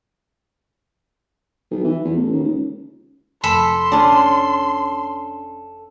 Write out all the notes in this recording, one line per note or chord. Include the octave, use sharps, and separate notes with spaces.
B1
E3
E2
A1
D#2
C#2
F1 A4 B5 C6
C#4 D4